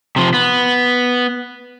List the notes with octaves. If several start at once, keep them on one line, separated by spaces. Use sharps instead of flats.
C3 F3
B3